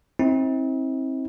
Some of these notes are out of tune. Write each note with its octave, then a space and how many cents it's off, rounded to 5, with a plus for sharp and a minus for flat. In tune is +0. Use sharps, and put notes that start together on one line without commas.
C4 +25 E4 -45